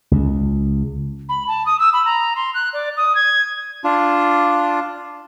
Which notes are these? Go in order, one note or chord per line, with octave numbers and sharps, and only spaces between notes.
C#2
B5
A5
D#6
E6
B5
A#5
C6
F#6
D5
D#6
G#6
D4 F4